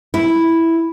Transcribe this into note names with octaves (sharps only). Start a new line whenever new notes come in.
E4